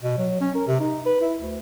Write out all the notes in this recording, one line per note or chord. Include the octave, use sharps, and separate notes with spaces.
B2
F#3
C#4
A#4
C3
D#4
B4
E4
D2